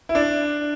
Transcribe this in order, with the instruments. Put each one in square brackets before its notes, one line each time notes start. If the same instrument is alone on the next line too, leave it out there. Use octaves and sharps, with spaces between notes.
[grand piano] E4
D4